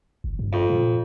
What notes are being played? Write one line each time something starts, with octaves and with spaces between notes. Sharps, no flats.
G1
G2
F2
A#2